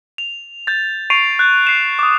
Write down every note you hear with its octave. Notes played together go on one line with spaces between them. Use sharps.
F7
G6 A6
C#6 C7 D7 D#7 F7
F#6 G6
C7 E7
D6 D#6